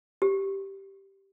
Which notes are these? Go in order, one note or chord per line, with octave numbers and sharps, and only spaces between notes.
G4